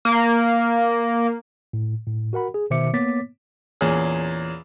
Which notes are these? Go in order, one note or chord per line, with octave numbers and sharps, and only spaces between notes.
A#3
A2
A2
F#4 A#4 F#5 B5
G#4
B2 D#3 C5 E5 D6 C#7
A#3 B3 C#5 D6 A6 B6
E2 A#2 C#4 G#4